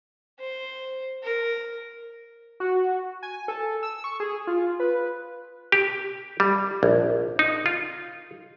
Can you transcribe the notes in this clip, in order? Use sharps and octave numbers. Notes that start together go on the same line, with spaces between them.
C5
A#4
F#4
G#5
A4
E6
C#6
G#4
F4
B4
G4
G3
A#1
D#4
F4